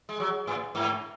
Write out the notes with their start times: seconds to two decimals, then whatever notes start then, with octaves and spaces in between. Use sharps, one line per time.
0.09 G#3
0.20 F#3
0.47 A2
0.75 G#2